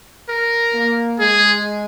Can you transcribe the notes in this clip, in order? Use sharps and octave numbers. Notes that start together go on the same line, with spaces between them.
A#4
A#3
G#3 G#4